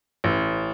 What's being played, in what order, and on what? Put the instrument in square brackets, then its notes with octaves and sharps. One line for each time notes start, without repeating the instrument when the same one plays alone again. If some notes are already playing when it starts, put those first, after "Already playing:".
[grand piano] A1